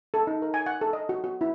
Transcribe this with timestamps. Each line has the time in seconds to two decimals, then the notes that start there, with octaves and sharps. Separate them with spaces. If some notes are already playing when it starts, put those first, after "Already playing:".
0.14 A4
0.27 D#4
0.42 A#4
0.54 G#5
0.66 F#5
0.81 A4
0.93 D#5
1.09 F#4
1.24 F#4
1.41 E4